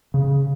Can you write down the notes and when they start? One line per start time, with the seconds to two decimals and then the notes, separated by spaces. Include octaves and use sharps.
0.14 C#3